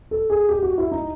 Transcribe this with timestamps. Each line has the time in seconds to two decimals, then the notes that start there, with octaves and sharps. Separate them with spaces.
0.11 A4
0.30 G#4
0.49 G4
0.62 F#4
0.78 E4
0.92 D#4